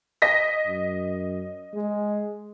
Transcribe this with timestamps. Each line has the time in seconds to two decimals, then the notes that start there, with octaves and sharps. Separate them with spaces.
0.22 D#5 A#6 B6
0.67 F#2
1.74 G#3